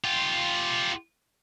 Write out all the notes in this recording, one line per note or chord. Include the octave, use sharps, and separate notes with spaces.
F4 G4